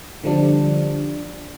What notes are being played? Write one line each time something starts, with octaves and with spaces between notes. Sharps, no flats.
D3 F3 G3 D4